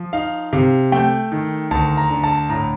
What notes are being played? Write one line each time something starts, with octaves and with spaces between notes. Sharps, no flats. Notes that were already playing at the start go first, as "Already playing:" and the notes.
Already playing: F3
D#4 F5
C3 F5
A3 G5
D#3
D2 A5
A#5
D3
A5
A2 A#5